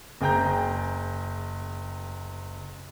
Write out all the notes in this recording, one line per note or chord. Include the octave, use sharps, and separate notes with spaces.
F#1 G#4 G5 A#5 G6